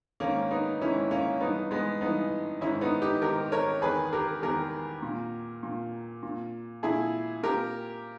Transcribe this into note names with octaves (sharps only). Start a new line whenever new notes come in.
D#3 A#3 C#4
G#2
B3 D#4
G#2 D#3 C#4 E4
A#3 C#4
G2 E3 B3 D#4
G#3 B3
G2 E3 B3 D#4
G#2 D#3 C#4 E4
B3 D#4
D#4 G4
G#2 D#3 G4 A#4
A#4 C#5
E2 D#3 G#4 B4
G4 A#4
E2 D#3 G4 A#4
A#2
A#2
A#2
A#2 E4 G#4
A#2 G4 A#4